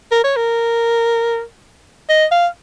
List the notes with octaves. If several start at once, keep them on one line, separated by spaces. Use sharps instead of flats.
A#4
C#5
A#4
D#5
F5